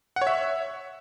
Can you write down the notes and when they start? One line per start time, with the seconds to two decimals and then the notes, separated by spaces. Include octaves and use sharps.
0.16 F#5
0.22 C#5
0.27 E5